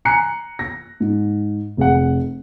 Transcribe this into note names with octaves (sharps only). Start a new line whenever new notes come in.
G#5 A#5 F#6 C7 C#7
A#6
G#2
F1 G#4 F#5